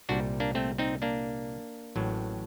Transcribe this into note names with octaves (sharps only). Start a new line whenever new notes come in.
C2 A#2 G3 D4 F#4
A#3 D4
A3 C4
C4 D#4
A#3 D4
A1 A2 F#3